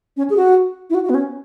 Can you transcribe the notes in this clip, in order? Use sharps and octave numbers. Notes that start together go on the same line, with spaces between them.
C#4
G#4
F#4
E4
F#4
F#4
B3
C#4